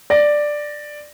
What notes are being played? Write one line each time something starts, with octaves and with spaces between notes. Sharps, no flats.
D5 A#6